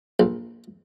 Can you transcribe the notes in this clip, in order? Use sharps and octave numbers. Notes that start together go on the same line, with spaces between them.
A#1